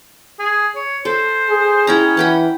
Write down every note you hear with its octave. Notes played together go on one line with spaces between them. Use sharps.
G#4
C#5
A4 C5
G#4
C#4 E4 G5 A#5
E3 F#5 G5 B5